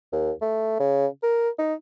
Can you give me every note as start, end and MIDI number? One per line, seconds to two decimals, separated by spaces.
0.12 0.32 39
0.41 0.80 57
0.80 1.07 49
1.23 1.49 70
1.59 1.74 63